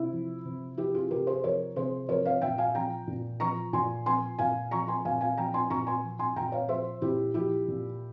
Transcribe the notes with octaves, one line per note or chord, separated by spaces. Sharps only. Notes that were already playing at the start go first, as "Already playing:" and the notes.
Already playing: C3 E4
F3
C3
F3 E4 G4
F4 G#4
C3 G4 A#4
G#4 C5
F3 A#4 C#5
C3 G#4 C5
F3 A#4 C#5
C#5 F5
A#2 E5 G5
F5 G#5
F3 G5 A#5
A#2
F3 A#5 C#6
A#2 G#5 C6
F3 G#5 C6
A#2 F5 G#5
F3 A#5 C#6
G#5 C6
A#2 F5 G#5
F5 G#5
F3 G5 A#5
G#5 C6
A#2 A#5 C#6
G#5 C6
F3
G#5 C6
A#2 G5 A#5
C#5 F5
F3 C5 E5
A#2 E4 G4
F3 E4 G4
A#2